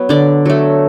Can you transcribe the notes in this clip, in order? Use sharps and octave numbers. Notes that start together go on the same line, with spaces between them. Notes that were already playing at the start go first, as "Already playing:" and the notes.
Already playing: F#3 B3
D3 D5
F#3 A3